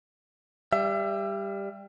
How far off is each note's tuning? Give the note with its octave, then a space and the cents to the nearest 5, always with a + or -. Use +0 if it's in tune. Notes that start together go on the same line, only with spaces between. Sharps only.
G3 +15 E5 +35